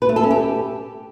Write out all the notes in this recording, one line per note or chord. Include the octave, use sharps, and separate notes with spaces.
B4
A3
A4
C#4
G4